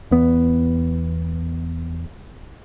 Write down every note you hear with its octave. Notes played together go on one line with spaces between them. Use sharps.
E2 B3